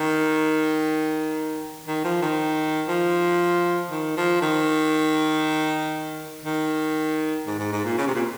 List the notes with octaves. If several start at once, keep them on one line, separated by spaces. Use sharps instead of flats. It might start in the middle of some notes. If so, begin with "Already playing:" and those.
Already playing: D#3
D#3
F3
D#3
F3
D#3
F3
D#3
D#3
G#2
G#2
G#2
A#2
C#3
C3
A#2